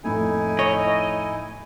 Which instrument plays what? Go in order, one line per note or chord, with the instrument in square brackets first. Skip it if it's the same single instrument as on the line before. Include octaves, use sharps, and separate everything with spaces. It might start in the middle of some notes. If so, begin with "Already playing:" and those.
[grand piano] F2 A2 A3 [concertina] D#4 E4 G#5
[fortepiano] C#5 [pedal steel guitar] D#5